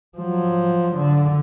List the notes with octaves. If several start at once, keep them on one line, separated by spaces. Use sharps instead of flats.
F3 F#3
D3